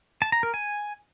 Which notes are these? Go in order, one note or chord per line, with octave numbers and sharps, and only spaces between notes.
A5
A#5
A#4
G#5